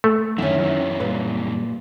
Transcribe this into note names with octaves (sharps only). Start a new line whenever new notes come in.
A3
F#2 D3 D#3 C#4 E4
F#2 E3 F#3 E4
A#2 G3 B4